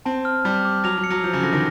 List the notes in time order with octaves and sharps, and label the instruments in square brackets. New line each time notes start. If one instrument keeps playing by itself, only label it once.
[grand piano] C4 [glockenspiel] A5
[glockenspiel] F6
[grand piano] G3 [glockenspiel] A5
[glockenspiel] D6
[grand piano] F#3 [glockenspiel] F7
[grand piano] F#3
[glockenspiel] C#7
[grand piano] F#3
[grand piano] F3 [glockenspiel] G6
[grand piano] C#3
[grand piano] D3 [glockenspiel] A#6
[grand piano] D#3